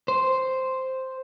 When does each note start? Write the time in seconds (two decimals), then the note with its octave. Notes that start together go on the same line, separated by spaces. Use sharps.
0.08 C5